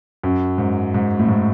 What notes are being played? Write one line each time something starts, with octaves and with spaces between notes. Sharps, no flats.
F#2
G#2
G#2
A2
G#2